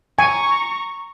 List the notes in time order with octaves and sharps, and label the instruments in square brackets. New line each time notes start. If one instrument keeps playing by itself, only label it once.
[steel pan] G#5 [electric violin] A#5 C#6